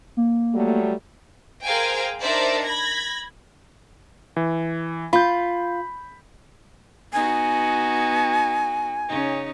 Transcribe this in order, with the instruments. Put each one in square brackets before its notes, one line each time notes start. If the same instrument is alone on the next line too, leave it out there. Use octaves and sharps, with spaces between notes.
[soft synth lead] A#3
[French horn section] F#3 G3 A3
[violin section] G#4 A#4 C5 F5 G5 G#5
D4 D#4 A#4 C5 D5 E5
B5 G#6 A#6
[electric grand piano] E3
[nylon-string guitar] F4 [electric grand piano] B5 G6
[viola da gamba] B3 D#4 F#4 [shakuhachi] G#5
[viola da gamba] C#3 C#4 D#4